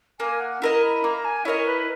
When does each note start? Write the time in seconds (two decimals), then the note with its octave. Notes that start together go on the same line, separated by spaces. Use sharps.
0.20 A#3 G#5
0.40 F#5
0.62 E4 A#4 D#5 A#5
0.83 B5
1.04 A#3 A#5
1.25 G#5
1.45 E4 A#4 C#5 D#5
1.66 B4